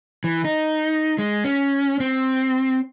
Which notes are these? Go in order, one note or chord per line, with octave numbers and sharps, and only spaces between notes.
E3
D#4
G#3
C#4
C4